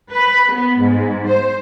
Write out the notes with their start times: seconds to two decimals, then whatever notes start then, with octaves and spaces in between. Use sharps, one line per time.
0.14 B4
0.53 B3
0.82 G#2
1.28 C5